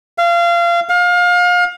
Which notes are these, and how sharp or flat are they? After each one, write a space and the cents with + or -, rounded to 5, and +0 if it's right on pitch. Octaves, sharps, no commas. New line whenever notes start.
F5 -25
F5 +30